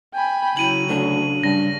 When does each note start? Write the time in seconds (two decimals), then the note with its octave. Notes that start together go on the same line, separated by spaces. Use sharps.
0.14 G5 G#5 B5
0.57 C#3 F#3 E4 D#7 F#7
0.88 D2 D4
1.43 G2 C#3 A#6